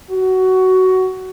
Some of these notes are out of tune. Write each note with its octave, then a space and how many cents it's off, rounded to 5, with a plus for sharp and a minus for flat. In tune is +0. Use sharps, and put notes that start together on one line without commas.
F#4 +15